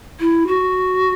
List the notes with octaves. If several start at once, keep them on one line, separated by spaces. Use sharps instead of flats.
E4
F#4